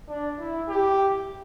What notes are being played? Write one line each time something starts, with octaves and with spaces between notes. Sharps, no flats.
D4
E4
G4